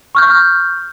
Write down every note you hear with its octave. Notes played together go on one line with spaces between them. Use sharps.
C#6 F6 G6